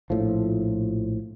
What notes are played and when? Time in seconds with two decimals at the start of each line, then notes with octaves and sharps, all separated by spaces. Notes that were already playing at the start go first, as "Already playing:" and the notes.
0.10 A#1 A2 F3